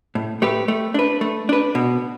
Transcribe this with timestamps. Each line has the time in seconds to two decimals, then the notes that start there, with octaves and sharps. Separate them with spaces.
0.15 A2
0.42 A3 G4 B4
0.68 A3
0.94 D4 B4
1.21 A3
1.49 D4 B4
1.75 B2